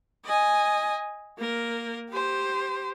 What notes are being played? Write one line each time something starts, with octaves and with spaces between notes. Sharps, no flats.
D#5 G#5
A#3 A#4
G4 C5